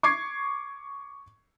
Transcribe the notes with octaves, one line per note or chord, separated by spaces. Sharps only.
C#6 D6 G#6 C7